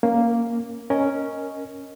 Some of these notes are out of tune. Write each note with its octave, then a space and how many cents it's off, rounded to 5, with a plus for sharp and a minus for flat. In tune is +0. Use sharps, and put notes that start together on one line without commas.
A#3 +0 C#4 +0
C#4 +0 A#4 +0 D#5 +0